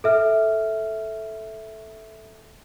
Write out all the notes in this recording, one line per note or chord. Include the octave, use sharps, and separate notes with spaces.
A4 E5 F6